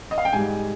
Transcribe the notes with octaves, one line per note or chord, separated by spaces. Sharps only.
D#5
F5
G5
G#2 G3 G#5